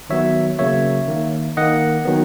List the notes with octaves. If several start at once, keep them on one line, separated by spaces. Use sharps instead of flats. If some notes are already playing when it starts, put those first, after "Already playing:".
D#3 F#3 B3 C#5 E5
C#3 F#3 A#3 C#5 E5
D#3 A#3
D#3 A#3 D#5 F#5
D#3 F#3 B3